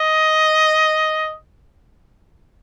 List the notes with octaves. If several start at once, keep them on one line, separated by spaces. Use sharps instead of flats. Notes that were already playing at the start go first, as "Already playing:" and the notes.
Already playing: D#5